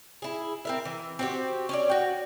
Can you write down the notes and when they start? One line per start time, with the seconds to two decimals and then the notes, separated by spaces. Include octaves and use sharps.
0.22 E4 G#4
0.65 C4 A#4 E5
0.85 E3
1.19 C4 F#4 G4
1.69 C#4 C#5 D5
1.90 F#4 G5